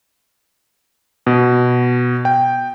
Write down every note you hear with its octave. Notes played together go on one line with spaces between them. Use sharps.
B2
G5